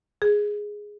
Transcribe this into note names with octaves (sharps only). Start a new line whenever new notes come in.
G#4